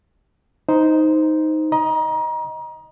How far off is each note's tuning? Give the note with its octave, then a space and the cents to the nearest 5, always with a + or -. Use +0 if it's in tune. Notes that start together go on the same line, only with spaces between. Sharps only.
D#4 +10 C5 -10 D#5 +0
D#5 +0 A#5 +30